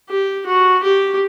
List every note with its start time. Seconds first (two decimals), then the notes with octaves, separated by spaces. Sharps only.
0.09 G4
0.46 F#4
0.83 G4